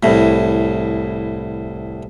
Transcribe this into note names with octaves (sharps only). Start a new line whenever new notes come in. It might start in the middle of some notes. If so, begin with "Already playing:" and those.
C2 A2